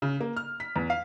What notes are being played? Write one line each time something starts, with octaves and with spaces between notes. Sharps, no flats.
C#3
A#3
F6
B6
E2
F5